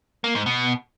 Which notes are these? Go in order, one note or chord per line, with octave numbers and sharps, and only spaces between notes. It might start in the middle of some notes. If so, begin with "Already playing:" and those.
A#3
G#2
B2